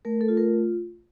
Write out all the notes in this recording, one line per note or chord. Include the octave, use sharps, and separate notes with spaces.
A3 A#4
A4
F4
A#4